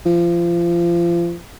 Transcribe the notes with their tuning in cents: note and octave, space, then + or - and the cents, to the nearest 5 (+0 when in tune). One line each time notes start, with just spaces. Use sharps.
F3 -30